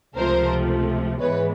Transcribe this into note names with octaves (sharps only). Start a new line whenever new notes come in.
C#2 C3 F3 A3 A#4 C5
G#2 E3 G#3 B3 B4 C#5